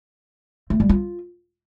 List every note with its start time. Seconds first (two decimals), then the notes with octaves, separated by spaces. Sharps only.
0.70 A3
0.80 G3
0.89 F4